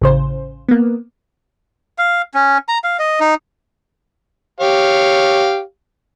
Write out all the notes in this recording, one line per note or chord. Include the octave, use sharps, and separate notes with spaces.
A1 C#3 C5
A#3 B3
F5
C#4
A#5
F5
D#5
D#4
G4 C#5 F5